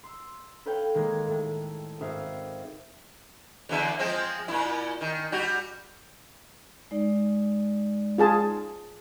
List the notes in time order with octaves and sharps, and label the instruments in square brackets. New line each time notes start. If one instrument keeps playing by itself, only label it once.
[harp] C6 E6
A4 B4 C#5 F5 G5
D#3 G#3 A#3 G#6
A2 E5 A5
G#1 E5 F5 F6 C7
[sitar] E2 D3 E5
F3 G#3 C4
A#2 E4
D#3
G3 F#4
[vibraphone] G#3 D#4 D5
[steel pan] F4 G#4 A5